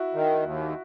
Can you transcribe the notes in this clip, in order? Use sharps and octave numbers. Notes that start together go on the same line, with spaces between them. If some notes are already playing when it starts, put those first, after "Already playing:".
Already playing: E4 F#4
D#3
D#2